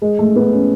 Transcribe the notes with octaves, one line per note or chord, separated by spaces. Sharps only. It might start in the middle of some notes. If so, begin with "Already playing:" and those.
G#3
A3
B3
C#4